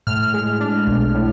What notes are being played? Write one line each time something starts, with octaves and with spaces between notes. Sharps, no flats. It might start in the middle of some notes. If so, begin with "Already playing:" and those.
A2 F6
G#3
D4
B1
A2